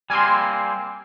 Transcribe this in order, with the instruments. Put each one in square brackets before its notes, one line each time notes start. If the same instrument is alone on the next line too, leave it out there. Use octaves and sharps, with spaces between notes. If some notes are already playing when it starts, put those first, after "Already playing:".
[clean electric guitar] G3 A#3 C4 [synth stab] G#5 C6